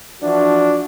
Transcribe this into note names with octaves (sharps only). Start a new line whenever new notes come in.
E3 F3 D4 F#4